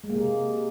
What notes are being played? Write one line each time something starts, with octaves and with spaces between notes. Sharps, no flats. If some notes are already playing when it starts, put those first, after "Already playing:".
G#3
A#3
C3